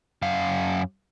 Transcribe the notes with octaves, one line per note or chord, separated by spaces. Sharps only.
F#2 F5